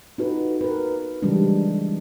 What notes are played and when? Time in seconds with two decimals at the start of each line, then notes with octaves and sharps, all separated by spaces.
0.18 D#4 F4 F#4 A4 B4
0.61 A#4 B4
1.22 C#3 E3 F3 G3 G#3 D4